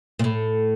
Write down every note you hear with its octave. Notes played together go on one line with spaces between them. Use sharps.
A#2
A2